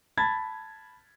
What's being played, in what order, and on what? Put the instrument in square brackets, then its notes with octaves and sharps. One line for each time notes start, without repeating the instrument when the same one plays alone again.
[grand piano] A5 B5 G#6 A6